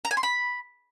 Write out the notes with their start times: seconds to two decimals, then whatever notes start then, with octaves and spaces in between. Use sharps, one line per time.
0.05 A#5
0.11 G#5
0.17 C6
0.23 B5